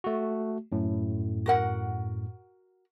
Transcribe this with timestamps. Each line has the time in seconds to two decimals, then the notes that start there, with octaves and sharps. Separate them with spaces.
0.04 A3 F#4
0.72 F#2 A2
1.46 F#4 A#4 F#5